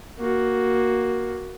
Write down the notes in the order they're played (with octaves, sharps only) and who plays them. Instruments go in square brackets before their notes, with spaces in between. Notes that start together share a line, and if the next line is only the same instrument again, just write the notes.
[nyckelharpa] A#3 F#4